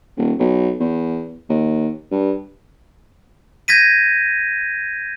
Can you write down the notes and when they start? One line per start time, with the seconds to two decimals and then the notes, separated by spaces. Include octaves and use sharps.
0.17 D#1
0.39 B1
0.80 E2
1.49 D#2
2.11 G2
3.68 G6 G#6 A#6 B6 D#7